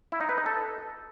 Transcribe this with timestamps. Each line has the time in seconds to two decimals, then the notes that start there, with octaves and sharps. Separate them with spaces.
0.12 E4
0.21 D#4
0.29 B4
0.38 D#4
0.46 A4